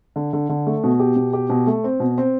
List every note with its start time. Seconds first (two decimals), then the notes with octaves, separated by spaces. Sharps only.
0.16 D3
0.33 D3
0.49 D3
0.67 A3
0.84 B2
0.99 G4
1.16 B2
1.33 G4
1.50 B2
1.67 A3
1.84 C4
2.00 B2
2.18 C4